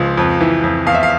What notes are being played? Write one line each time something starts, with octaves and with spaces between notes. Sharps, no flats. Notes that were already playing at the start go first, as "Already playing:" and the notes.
Already playing: C#2 F3
F2
E3
F2
E2 F5
E5
F5